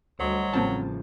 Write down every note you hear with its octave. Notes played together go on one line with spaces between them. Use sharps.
D2 F#3 G3 C5 D#5
A1 C#3 F3 A#3 C4 A5